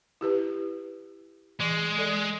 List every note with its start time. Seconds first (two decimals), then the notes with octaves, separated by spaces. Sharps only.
0.21 E4 G4 B4
1.60 E3 G#3
1.98 A4 D5